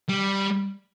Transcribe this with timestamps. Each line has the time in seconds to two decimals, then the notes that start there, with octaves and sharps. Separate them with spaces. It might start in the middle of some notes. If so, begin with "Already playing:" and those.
0.09 G3